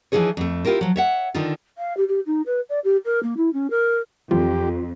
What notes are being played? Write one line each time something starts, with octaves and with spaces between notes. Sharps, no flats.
E3 F3 G3 D#4 G#4 C#5
F2 A3
E4 F4 G4 A#4 C5
F3 F#3
C#5 E5 F#5
D3 D#3 D#4 F4
F5
G4
G4
D#4
B4
D5
G4
A#4
A#3
E4
C#4
A#4
F2 E3 F#3 C4 F4 G4